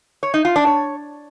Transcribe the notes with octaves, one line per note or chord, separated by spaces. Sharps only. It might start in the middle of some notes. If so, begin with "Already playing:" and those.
C#5
D#4
F4
D4
C#5